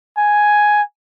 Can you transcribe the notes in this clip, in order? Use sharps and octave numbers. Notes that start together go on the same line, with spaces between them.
G#5